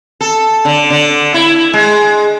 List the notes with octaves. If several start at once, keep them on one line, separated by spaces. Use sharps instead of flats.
A4
D3
D3
E4
G#3